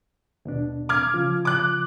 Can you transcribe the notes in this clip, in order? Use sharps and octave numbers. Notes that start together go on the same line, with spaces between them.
D#2 B2 D4
D6 F6 G#6
C#3 F3 F4
D6 F#6